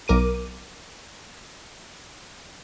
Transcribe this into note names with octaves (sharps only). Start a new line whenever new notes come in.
B1 A#4 D6 D#7